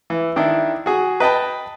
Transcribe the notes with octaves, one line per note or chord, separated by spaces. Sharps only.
E3
D#3 D4 E4
F#4 G#4
B4 D#5 G5 A5 B5